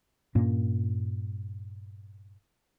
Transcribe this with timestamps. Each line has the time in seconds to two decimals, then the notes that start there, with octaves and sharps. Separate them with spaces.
0.35 G2 A#2 A#3 C#4